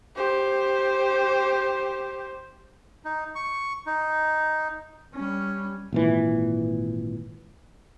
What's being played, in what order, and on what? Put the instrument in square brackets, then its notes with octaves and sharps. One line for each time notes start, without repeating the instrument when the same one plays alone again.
[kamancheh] G4 C5
[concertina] D#4
C#6
D#4
[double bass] G3 C#4
[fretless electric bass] G#1 A#2 E3